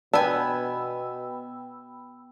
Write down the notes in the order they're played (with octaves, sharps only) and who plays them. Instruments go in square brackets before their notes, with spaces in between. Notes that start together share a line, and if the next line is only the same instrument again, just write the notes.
[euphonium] B2 [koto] B3 G#5 [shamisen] D4 [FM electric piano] G5 B5 E6